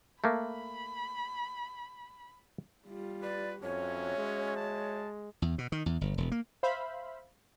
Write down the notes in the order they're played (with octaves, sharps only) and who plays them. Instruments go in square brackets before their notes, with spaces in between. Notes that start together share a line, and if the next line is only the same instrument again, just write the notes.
[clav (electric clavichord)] A3 A#3 [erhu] B5
[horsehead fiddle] G3 F4
[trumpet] B4 [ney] D5
[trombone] F2 [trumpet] C#4 [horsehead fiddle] F#4 E5 [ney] C#5
[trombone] G#3
[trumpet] A5
[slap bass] E2
B2
D#3
E2
G1
E1
A#3
[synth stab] C5 E5 F5 B5